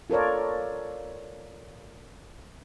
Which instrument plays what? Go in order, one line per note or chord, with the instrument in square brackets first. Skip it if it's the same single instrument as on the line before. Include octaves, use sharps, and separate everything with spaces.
[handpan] F4 A4 A#4 C#5 D5